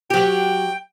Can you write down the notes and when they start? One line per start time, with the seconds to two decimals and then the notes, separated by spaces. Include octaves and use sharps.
0.10 F#3 G4 G5